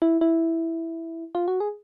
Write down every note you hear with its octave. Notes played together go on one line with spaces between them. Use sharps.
E4
E4
F4
F#4
G#4